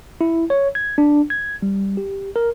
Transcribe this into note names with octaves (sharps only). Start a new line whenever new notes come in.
E4
C#5
G#6
D4
G#6
G3
G4
A#4